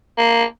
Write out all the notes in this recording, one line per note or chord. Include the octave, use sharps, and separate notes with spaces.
A#3